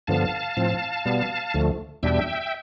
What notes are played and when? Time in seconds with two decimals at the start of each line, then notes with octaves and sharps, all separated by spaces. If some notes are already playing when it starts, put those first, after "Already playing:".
0.07 G2 D3 F3 B3 F5 A5
0.57 A2 F3 C4
1.05 B2 G3 B3
1.54 D2 D3 F3 A3
2.03 E2 B2 G3 D4 E5 G5